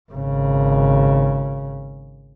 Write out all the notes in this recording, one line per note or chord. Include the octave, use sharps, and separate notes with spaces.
G#1 C#3